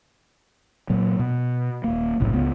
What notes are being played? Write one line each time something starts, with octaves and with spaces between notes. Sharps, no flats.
A#2 F#3
B2
D#1 A#3
F#1 B1 A2 C3
C#2 B3